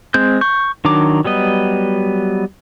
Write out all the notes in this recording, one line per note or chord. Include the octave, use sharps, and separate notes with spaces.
G#3 C4 G6
C#6 G6
D#3 F#3 D4 A#5 D6
F#3 G3 B3 D#5